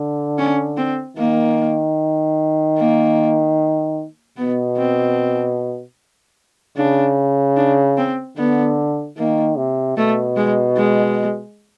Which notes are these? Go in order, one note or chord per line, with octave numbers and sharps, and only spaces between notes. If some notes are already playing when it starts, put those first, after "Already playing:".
Already playing: D3
C#4
C4
D#3 A#3
A#3
B2 B3
C4
C#3 D4
D4
C4
D3 B3
D#3 A#3
C3
B2 A3
G#3
G#3